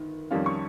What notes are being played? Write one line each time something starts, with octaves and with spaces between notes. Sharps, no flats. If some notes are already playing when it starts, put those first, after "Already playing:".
Already playing: G1 D#3
F2 D#3 G3 C#4 F5
C#6